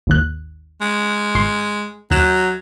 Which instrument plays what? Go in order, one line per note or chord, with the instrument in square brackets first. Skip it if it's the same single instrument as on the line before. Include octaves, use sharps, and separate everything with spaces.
[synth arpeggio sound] G#1 D#2 F#6
[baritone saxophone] G#3
[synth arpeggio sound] G#1 C6
[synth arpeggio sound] D#2 F#6 E7 [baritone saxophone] F#3